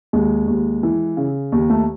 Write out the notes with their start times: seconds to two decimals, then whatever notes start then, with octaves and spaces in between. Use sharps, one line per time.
0.13 D#2 G#3
0.48 D#2
0.83 E3
1.17 C#3
1.52 D#2
1.70 A3